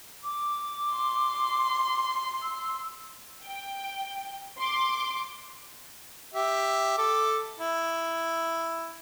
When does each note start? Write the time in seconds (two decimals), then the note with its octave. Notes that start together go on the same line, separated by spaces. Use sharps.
0.23 D6
0.91 C6
2.42 E6
3.44 G5
4.59 C6 D6
6.34 G4 E5
6.98 A4 D6
7.60 E4